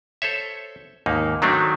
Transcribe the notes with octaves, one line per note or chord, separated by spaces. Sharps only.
A4 C5 C#5 E5
D#2 G#2 A#3 D#4
D#3 F#3 A3 C4 D4 D#4